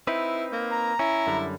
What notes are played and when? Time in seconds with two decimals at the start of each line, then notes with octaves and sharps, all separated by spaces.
0.07 C4 D#4 E4 B4
0.52 A#3
0.71 A#5
0.99 C#4 E4
1.27 F#2 D3 G3